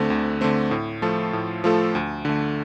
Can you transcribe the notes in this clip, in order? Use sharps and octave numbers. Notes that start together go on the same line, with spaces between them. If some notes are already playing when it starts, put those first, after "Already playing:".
Already playing: D2 D3 A3 C4
D2
D3 A3 C4
A2
F3 A3 F4 A4
A2
F3 A3 F4 A4
D2
D3 A3